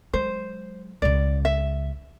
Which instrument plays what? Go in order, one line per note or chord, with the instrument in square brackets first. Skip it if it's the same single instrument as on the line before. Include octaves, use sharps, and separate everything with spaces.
[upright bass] F#3 G#3 [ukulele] C5
[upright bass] C#2 C#3 [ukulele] D5
[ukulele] E5